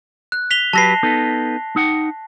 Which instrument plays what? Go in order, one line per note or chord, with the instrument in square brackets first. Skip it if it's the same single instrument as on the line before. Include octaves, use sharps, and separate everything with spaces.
[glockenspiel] F#6
B6 F7 G7
[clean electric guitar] F#3 G4 B4 [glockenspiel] A5 A#6 C7
[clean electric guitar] B3 D#4 A4
D#4 F#5 G5